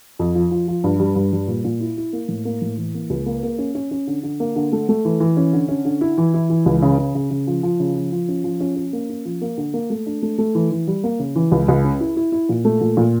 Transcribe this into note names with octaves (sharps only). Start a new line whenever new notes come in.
F2
F3
F3
F3
G2
G3
G2
G3
A#2
A#2
E4
E4
A#3
A2
A#3
A2
E3
A#3
C#2
A#3
A#3
C#4
C#4
C#4
D3
D3
A#3
D3
A3
A3
E3
E3
C#4
D3
C#4
D3
E4
E3
E4
E3
C#2
C#3
C#3
C#3
C#3
F3
F3
C#3
F3
F3
C#4
F3
C#4
C#4
A#3
C#4
F3
A#3
D3
A#3
A3
D4
A3
A3
E3
E3
G3
A#3
C#3
E3
C#2
C#2
C#4
E4
E4
E4
A#2
A3
A#2
A#2